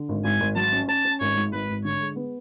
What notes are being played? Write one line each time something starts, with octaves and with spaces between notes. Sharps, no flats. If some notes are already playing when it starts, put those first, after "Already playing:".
Already playing: D3
G#1
G#1 G#5
G#1
F#3 A5
C#4
C#4 A5
C#4
G#1 C#5
G#2
G#1 B4
G#1
D3 C#5
G#3
B3